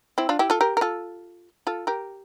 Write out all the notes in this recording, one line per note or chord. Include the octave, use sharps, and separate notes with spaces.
C4 E4
D4 F4
E4 G4
F4 A4
G4 A#4
A#4
F4 A4
F4 A4
G4 A#4